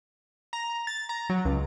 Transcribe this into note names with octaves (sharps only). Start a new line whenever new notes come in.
A#5
A6
A#5
F#3
C#2